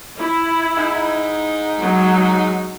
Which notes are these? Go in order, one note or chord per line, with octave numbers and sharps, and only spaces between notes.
E4
G#2 D#4
F#3 G#3